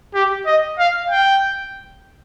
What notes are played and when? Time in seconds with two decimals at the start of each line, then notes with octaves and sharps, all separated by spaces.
0.14 G4
0.46 D#5
0.79 F5
1.10 G5